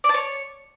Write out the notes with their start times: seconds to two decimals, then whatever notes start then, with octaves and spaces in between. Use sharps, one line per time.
0.04 D5
0.09 A5
0.14 C#5